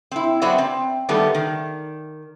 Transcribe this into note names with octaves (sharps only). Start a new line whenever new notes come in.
C4 E4
F#3 B3 C4 F#4 D5 E5
C4
D#3 G3 A3 B3
D#3